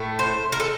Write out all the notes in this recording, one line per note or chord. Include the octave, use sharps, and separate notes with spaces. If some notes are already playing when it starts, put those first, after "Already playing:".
Already playing: A2 A3
C5
A#4
A4